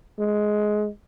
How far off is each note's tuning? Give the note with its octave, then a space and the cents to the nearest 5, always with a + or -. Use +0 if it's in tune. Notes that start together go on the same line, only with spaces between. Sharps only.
G#3 +15